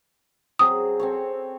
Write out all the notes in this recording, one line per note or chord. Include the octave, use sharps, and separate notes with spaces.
F#3 C4 G#4 D#6
C4 A4 C#5